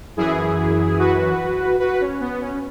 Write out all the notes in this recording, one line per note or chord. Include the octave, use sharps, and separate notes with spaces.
F#2 E3 E4 G#4
F#4 B4
F#4 B4
C#4
B3
C#4